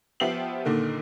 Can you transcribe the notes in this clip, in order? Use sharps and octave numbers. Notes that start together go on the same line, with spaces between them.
F3 B3 G4 E5 C7 F#7
A#2 D3 D#3 A#3